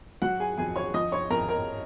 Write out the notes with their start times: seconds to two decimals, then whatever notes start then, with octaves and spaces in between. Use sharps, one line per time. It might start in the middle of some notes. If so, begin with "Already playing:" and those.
0.22 F#3 F#4 F#5
0.40 G#4 G#5
0.58 F2 G#4 G#5
0.76 C#5 C#6
0.94 F3 D#5 D#6
1.12 C#5 C#6
1.30 F2 A#4 A#5
1.49 A#4 A#5